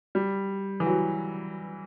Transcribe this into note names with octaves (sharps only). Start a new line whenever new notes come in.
G3
E3
F#3